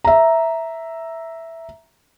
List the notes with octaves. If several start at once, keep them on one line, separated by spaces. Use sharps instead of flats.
E5 A#5